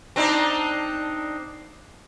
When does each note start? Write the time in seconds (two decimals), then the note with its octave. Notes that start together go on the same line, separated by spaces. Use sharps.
0.16 C4 D4 D#4